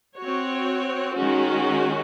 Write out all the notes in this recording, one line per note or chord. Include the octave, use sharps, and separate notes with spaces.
C4 F#4 C#5
D#3 G#3 C#4 F#4